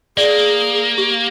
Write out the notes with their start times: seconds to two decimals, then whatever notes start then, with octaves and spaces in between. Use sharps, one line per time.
0.18 A#3 G#4 D5
0.98 G4